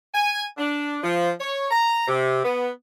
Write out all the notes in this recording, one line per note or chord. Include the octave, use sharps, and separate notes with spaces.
G#5
D4
F3
C#5
A#5
C3
B3